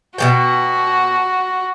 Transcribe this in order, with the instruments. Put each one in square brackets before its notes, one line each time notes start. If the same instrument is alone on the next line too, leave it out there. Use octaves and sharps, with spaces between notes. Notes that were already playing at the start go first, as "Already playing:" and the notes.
[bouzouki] B2 G#3 G5 [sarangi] F#4